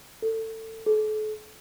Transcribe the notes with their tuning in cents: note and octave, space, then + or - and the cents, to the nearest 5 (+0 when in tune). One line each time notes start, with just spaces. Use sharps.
A4 +25
A4 -40